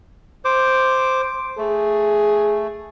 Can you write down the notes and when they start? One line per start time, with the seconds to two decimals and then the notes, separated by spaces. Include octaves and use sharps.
0.45 C5 D6
1.58 A3 G#4